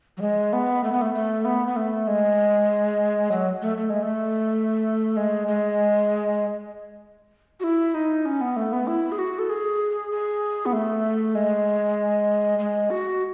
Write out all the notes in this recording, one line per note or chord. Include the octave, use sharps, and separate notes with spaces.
F#3
G#3
B3
A3
B3
A3
A3
B3
B3
A3
G#3
F#3
A3
A3
G#3
A3
G#3
G#3
F#4
E4
D#4
C#4
B3
A3
B3
E4
G#4
F#4
A4
G#4
G#4
B3
A3
G#3
G#3
F#4